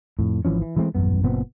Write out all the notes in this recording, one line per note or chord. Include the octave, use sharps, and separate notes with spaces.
F2 A2
G#1 E3 F3 C#4
E3
E3 G#3 A3 C4
D#1 A1 F#2 B3
F#1 A#2 B3 C4